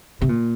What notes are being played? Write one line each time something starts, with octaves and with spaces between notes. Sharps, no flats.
C3
A#2